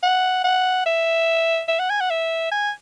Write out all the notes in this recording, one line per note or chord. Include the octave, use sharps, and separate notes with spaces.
F#5
F#5
E5
E5
F#5
G#5
F#5
E5
G#5